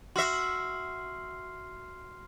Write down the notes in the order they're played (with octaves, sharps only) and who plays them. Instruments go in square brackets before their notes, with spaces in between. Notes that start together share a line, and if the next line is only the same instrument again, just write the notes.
[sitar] F#4 E5 [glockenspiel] C6 F6 C7